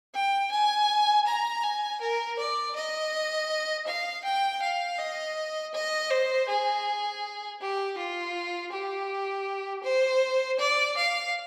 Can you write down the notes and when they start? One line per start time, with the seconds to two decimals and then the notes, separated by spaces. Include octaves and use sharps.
0.14 G5
0.51 G#5
1.26 A#5
1.63 G#5
2.01 A#4
2.38 D5
2.76 D#5
3.87 F5
4.24 G5
4.62 F5
4.99 D#5
5.74 D#5
6.10 C5
6.48 G#4
7.60 G4
7.98 F4
8.72 G4
9.84 C5
10.59 D5
10.97 F5